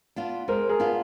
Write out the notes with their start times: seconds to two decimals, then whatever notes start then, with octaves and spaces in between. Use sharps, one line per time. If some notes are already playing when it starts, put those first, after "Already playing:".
0.16 B3 D4 F4
0.48 G#3 A#4 C5
0.69 G#4 A#4
0.79 B3 D4 F4